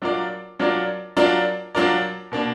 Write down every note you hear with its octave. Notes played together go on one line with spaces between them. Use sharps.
F#3 D4 F4 A#4 D5
F#3 D4 F4 A#4 D5
F#3 D4 F4 A#4 D5
F#3 D4 F4 A#4 D5
B2 A#3 D4